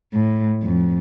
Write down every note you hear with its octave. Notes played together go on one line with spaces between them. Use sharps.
A2
F2